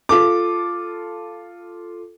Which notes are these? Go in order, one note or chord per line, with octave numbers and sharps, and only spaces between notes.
F4 A4 D6